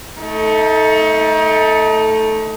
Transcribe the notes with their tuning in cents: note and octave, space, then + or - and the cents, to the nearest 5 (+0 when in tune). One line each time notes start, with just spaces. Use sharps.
A3 +0 D#4 +30